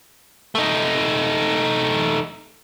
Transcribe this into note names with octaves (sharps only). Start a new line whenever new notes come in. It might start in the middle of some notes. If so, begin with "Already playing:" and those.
A3 D#4